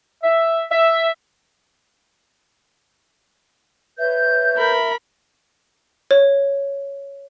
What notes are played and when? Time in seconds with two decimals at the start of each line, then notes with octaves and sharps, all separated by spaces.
0.24 E5
0.71 E5
3.99 B4 C#5 E5 G6
4.56 A#4 B5
6.11 C#5